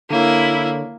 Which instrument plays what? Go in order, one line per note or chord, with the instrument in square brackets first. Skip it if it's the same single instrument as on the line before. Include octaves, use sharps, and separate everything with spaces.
[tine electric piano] D3 C#5 [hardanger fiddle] A#3 [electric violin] E4